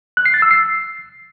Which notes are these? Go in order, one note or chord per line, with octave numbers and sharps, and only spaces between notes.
F#6
C7
A6
E6
C7